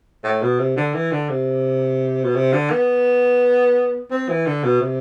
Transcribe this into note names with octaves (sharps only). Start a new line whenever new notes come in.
A2
B2
C3
D3
E3
D3
C3
B2
C3
D3
B3
C4
E3
D3
B2
C3